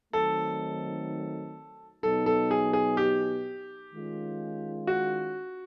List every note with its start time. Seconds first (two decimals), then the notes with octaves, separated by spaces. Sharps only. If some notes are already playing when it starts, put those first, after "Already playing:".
0.13 D#3 F#3 A3 C4 D#4 A4
2.03 B2 F#3 B3 D#4 A4
2.26 A4
2.51 G#4
2.73 G#4
2.97 G4
3.93 D#3 G#3 C#4 F4
4.87 F#4